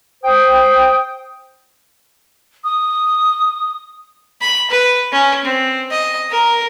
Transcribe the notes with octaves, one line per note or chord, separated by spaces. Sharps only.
C5 G5 D#6
D#6
B5
B4
C#4
C4
D#5
A#4